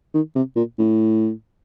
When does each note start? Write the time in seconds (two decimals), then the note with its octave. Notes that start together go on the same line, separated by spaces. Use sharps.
0.14 D#3
0.35 C3
0.56 A#2
0.78 A2